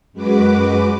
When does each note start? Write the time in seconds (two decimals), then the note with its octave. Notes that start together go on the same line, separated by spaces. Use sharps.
0.13 F#2 G#3 F#4 B4 D6